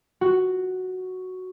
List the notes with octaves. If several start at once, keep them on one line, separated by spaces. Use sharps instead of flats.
F#4